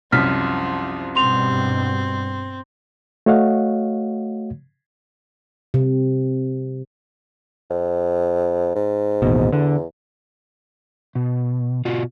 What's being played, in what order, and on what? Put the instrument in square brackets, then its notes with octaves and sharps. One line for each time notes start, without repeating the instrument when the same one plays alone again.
[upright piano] C2 F#2 B6 [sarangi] F3 [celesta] F6
[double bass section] G2 B2 [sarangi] C4 [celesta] C6 F7
[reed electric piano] A3 F#4 C#5 D#5 F5 F#5
[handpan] C3
[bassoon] F2
G#2
[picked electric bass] A1 D#2 B2
[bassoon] E2 [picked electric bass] D3
[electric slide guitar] B2
B2 F4 F#4